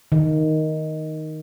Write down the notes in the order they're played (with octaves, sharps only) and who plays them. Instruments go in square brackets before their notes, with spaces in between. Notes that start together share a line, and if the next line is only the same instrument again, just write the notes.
[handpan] D#3